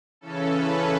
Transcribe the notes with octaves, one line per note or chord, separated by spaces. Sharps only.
C#3 E3 C#4 A4
B4